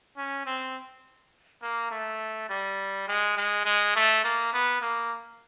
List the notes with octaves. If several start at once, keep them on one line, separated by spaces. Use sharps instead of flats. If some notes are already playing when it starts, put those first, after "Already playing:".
C#4
C4
A#3
A3
G3
G#3
G#3
G#3
A3
A#3
B3
A#3